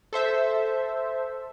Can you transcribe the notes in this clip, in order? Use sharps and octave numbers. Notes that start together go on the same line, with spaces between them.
A4 C5 E5